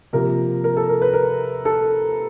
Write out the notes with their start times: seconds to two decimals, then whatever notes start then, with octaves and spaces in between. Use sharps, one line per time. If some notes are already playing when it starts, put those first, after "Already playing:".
0.13 C3 F3 A#3 A#4
0.64 A#4
0.77 A4
0.89 A#4
1.02 B4
1.14 A#4
1.65 A4